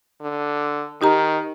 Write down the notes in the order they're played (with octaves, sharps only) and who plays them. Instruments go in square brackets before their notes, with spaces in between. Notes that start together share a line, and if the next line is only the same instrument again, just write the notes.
[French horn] D3
[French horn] D#3 [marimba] D#4 G4 A#5